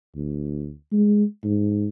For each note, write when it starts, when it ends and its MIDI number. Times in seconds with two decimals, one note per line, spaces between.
0.15 0.72 38
0.92 1.24 56
1.44 1.88 44